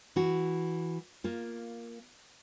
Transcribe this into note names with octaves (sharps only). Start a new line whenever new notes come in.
E3 F#4
A#3 F4